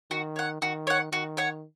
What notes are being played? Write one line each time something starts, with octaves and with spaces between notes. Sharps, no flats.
D#3 F#4
C#5 F#5
D#3 F#4
C#5 F#5
D#3 F#4
C#5 F#5